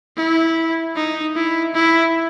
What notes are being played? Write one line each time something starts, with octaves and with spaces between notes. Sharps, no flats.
E4
D#4
E4
E4